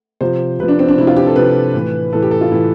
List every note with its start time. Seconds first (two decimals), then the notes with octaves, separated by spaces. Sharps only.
0.21 C3 F3 C5
0.59 C3 F3 B4
0.68 D4
0.79 C4
0.88 D4
0.98 C3 E4
1.02 F3
1.07 F4
1.16 G4
1.27 A4
1.36 C3 F3 B4
1.74 A2 E3
2.13 A2 E3 A4
2.22 G4
2.31 A4
2.41 F4
2.51 A2 E3 E4